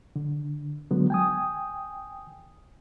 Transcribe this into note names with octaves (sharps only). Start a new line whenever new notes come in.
D3
D3 F#3 G#3 B3
G5 G#5 D#6